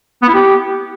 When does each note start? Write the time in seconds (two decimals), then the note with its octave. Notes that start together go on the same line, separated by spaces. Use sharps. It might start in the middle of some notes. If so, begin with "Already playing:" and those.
0.22 B3
0.28 E4
0.34 G4